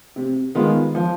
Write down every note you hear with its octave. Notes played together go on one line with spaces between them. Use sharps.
C3
D#3 G#3 B3 F4
F3